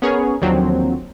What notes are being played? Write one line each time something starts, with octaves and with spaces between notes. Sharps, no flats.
B3 C#4 G#4 A#4 C#5
D#2 D3 F3 F#3 C4